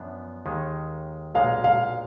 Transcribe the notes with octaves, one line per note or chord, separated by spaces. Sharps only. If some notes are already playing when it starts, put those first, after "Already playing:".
Already playing: F#2 F3 B3 D4
D#2 D#3 G#3
B1 A#2 G#3 F5
F5